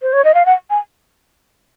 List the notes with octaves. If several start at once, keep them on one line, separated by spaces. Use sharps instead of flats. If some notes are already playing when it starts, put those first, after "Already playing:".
C5
C#5
D#5
F5
F#5
G#5